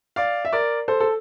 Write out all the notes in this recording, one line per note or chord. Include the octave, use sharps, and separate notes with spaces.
D5 F5
E5
A#4 D5
A4 C5
A4